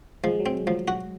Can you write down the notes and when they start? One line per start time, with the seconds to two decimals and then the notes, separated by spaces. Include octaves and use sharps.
0.24 F3 G#3
0.40 F#3
0.45 G#3 C4
0.67 F3 F#3
0.88 F#4